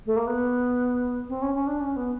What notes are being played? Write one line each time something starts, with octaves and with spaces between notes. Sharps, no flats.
A3
A#3
B3
C4
C#4
C#4
D4
C#4
B3